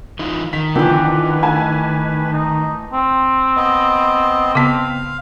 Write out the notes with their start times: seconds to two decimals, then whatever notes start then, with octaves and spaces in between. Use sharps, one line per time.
0.19 E3 D#4 F4
0.53 D#3 B6
0.75 D3 E3 F3 B3 G4 B4
1.43 A3 G#5 A5
2.33 D#4
2.93 C4
3.56 B3 D#5
4.55 C#3 B3 F5